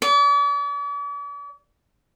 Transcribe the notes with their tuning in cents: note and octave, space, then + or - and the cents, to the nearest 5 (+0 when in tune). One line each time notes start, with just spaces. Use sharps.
D5 -45